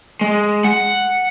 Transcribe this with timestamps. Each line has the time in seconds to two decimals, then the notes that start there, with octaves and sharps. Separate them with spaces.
0.21 G#3
0.64 F#5